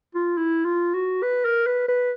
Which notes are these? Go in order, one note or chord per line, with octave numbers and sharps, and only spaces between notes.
F4
E4
F4
F#4
B4
A#4
B4
B4